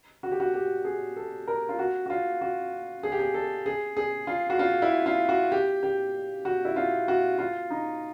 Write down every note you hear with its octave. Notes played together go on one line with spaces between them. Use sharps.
F#4
G4
F#4
G4
G#4
A4
A#4
F4
F#4
F#4
F4
F#4
G#4
G4
G#4
A4
G#4
G#4
F4
F#4
F4
E4
F4
F#4
G4
G4
F#4
E4
F4
F#4
F4
D#4